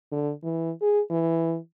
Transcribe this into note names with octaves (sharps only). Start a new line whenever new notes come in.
D3
E3
G#4
E3